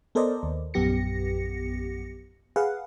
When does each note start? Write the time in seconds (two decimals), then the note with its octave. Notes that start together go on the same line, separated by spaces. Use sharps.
0.15 B3 A4 A#4 C5 D5 D#5
0.43 D#2
0.74 A#1 F#2 B3 G4 A#6 C#7
2.56 G#4 B4 F5 F#5